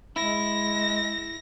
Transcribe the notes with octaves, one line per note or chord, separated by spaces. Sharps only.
G#3 E4 A#6